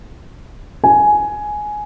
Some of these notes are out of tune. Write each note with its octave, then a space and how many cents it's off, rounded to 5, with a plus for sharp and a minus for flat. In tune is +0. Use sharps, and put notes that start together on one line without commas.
G#5 +10